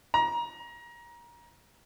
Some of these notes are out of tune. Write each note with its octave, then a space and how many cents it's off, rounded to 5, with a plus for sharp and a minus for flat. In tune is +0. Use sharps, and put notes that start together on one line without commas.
A#5 +25